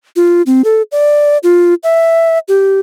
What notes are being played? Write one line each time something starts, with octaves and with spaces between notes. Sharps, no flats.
F4
C4
A4
D5
F4
E5
G4